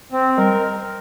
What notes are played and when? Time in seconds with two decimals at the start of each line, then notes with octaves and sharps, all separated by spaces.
0.12 C4
0.37 G3 A#4